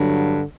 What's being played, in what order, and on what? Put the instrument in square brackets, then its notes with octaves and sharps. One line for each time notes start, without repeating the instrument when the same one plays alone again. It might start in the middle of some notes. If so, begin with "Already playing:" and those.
Already playing: [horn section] G2 D3 F#3